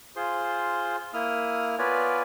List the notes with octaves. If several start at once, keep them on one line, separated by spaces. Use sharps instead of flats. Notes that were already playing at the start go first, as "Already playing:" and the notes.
F4 G#4 C5 C6
A#3 E4 D#6 F6
B3 F4 B4 C#5 D5 G#5